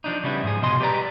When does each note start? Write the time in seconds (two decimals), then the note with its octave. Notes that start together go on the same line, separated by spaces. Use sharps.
0.04 F3 D4 D#4
0.24 C#3 G3 B3 E4
0.43 G#2 F3 G#4
0.62 C2 B2 D#5 C6
0.80 G4 B4 D5 A#5